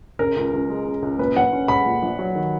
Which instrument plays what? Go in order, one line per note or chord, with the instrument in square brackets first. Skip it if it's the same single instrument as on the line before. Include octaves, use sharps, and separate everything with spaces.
[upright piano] C#3 [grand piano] A#4
[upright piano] C#2
C#2
G#3
C#3
C#2
[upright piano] A#2 [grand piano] B4
[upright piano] A#1 [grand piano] F#5
[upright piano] C#4
[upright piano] G#3 [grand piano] B5
[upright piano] A#2
A#1
F#3
D#3